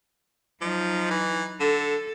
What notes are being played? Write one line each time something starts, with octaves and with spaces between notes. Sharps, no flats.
F3 F#3 D#4
E3
D3 A4